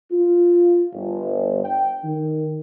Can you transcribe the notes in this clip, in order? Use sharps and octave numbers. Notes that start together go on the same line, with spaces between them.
F4
G1
G5
D#3